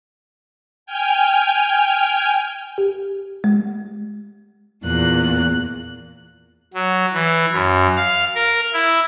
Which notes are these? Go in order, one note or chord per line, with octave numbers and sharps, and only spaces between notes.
G5 G#5 F6
G4
G#3
E2 A#2 F#6
F#3
E3
F#2
F5
A#4
E4